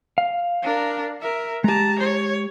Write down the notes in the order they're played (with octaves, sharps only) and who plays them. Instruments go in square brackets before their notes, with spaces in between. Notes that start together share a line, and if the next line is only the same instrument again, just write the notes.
[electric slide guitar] F5
[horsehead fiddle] D4 A#4
A#4 E5
[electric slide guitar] G#3 G4 [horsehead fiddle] A5 A#5
[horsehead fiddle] C#5